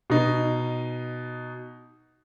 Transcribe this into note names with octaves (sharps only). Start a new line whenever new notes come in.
B2 D#4